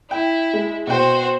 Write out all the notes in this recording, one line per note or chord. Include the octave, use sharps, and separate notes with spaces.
E4 G5
G#3
B2 F#4 C5 G5